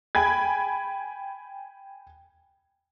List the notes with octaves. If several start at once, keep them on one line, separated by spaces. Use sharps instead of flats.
G5 G#5 B5 G#6